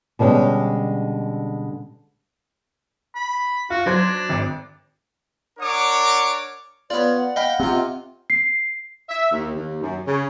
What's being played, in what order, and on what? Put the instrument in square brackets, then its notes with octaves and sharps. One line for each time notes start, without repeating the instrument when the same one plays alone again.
[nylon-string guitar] B2 D3 G3 G#3 C#4
[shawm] B5
[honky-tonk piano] F4 [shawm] F#4
[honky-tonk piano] F#3 C5 G#6 [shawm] D4
[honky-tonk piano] G#1 D6
[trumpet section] D4 A#4 C#5 F#5 D6
[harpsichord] B3 F4 [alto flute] C#5 [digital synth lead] D5
[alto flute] F#5
[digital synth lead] D#5 [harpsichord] F5 G5 B5
[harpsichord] C3 F4 [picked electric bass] C4
[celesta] C7
[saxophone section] E5
D#2
D#2
F#2
C#3